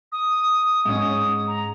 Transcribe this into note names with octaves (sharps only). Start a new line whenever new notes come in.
D#6
G#2 C#4 D#6
A#5